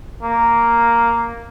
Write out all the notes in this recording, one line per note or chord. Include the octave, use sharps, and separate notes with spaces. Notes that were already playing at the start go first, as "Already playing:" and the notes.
A#3